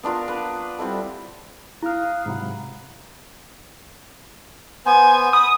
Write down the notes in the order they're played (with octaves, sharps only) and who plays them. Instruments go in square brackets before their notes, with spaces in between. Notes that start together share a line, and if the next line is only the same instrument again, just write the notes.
[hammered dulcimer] B3 D4 F4 A#4
B4
G3 C4 E4 A4
[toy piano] E4 [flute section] F5 D#6 F#6 [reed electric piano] A#5 F6
[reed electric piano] G#2 C3 F#3 [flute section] F#5 A#5 B5
[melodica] B3 C5 [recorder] G#5
[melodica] B5 [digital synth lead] D#6